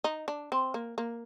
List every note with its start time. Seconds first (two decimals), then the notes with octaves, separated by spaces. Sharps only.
0.04 D#4
0.28 D4
0.52 C4
0.74 A#3
0.98 A#3